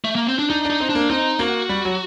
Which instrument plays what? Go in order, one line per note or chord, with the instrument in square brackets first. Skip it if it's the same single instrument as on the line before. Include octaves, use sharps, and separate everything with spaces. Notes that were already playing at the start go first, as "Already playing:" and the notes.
[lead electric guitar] A3
A#3
C4
D4
[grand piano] D4 [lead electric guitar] D#4
[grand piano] D4
[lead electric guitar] D#4
[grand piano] C4
[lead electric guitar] D4
[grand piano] A#3
[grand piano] C4 [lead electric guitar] D#4
[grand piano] A#3 [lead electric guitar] F#4
[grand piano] G3
F#3